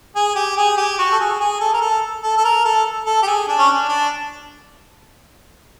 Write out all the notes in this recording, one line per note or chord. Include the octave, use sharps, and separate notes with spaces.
G#4
G4
G#4
G4
F#4
A4
G#4
G#4
A4
A#4
A4
A4
A4
A#4
A4
A4
G4
G#4
D4
C#4
D4
D4